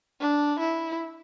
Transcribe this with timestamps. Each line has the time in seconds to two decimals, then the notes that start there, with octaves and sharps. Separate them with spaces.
0.20 D4
0.60 E4